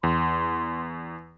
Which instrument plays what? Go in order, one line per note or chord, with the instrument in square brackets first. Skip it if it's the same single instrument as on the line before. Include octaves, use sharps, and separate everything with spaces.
[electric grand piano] E2 [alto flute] C6